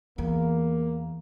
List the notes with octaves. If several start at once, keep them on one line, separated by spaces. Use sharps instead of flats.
E2 E3 A#3